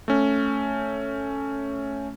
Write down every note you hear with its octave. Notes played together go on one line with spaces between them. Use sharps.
A3 C#4